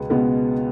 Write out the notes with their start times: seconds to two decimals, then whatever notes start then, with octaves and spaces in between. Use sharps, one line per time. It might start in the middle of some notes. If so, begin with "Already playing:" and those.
Already playing: C#2 B2 G#3 B3
0.10 C#2 B2 G#3 B3